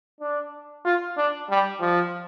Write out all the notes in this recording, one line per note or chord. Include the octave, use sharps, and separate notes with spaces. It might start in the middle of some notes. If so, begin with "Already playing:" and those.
D4
F4
D4
G3
F3